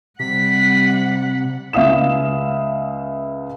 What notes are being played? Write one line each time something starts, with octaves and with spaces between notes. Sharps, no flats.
C3 G3 F#5 B6
C#2 E5 F5 D#6 E7